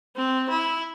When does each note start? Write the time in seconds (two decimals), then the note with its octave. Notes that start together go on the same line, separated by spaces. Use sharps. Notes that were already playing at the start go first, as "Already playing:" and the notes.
0.16 C4
0.50 E4